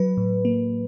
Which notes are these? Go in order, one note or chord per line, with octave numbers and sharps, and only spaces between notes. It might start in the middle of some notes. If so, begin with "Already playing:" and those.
Already playing: F#3 B4
A2
A#3